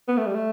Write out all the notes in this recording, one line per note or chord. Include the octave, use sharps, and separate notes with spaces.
B3
A3
G3
A3